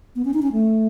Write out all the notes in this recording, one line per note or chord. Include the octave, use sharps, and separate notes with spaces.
B3
C#4
D#4
C#4
A3